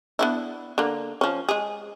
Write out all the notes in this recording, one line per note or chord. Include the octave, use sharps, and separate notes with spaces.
B3 D4 E4
D3 A#3
F3 C#4
G#3 G#4